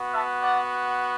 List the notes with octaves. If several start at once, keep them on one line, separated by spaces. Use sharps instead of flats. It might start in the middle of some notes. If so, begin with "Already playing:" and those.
Already playing: B3 F#4
E5 A5
D5 F#5